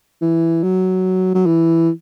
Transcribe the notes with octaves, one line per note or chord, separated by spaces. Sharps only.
E3
F#3
F#3
E3